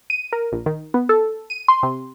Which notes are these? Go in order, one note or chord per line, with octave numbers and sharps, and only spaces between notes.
D#7
A#4
A#1
D#3
B3
A4
D#7
C6
C3